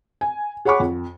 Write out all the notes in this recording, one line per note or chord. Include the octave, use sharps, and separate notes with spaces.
G#5
G#4 C#5 F#5 B5 C#6 D6
F2